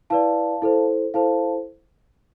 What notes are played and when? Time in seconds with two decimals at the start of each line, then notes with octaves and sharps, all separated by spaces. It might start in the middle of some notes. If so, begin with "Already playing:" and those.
0.10 E4 B4 D5 F5 A5
0.62 E4 A4 C5
1.14 E4 A4 C5 F5 A5